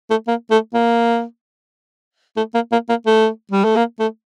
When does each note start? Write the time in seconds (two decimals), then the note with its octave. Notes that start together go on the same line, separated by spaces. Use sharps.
0.10 A3
0.27 A#3
0.51 A3
0.74 A#3
2.37 A3
2.54 A#3
2.72 A#3
2.89 A#3
3.06 A3
3.52 G3
3.64 A3
3.76 A#3
4.00 A3